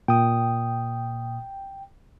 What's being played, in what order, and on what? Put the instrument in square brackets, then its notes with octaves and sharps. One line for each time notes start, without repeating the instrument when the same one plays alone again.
[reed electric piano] A#2 D#6 [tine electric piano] G5